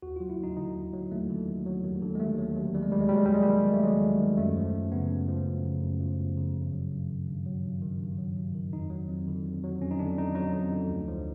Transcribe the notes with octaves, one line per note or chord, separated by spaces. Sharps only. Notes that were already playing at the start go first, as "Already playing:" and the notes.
D#2 F#4
F#3 F4
E4
D#2 D#4
D3 D#4
D#2
F#3
D#2 A3
D3
D#2
F#3
D#2
D3
G#3
D#2 A3
F#3
D#2
D#3 G3
G#3
D#2 G3
G#3
F#3 G3
G#3
D#2 G3
G#3
D#3 G3
D#2
A3
F#3 G#3
D#2
D#3
F#2 A3
F3
F#2
C#3 B3
F#2
F3
F#2
C#3
F#2
F3
F#2
C#3
G2
F#3
G2
D#3
G2
F#3
G2
D#3
G2
F#3
G2
D#3
F2 D#4
F#3
F2
D3
F2
F#3
F2 C#4
D#4
D3 D4
F2 D#4
F#3 D#4
F2
D3
D2
F3